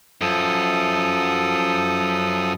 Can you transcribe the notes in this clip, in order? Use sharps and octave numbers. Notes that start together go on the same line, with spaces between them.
F#2 F3 A4 D#6